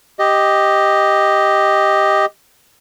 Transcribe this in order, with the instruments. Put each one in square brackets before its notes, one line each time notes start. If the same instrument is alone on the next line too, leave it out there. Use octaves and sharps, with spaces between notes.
[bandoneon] G4 D#5